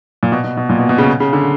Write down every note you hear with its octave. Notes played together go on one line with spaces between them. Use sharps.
A#2
B2
B2
B2
A#2
B2
B2
C#3
C#3
D3